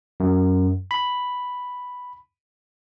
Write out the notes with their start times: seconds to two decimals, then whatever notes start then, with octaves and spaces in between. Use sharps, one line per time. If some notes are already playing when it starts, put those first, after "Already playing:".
0.20 F#2
0.91 B5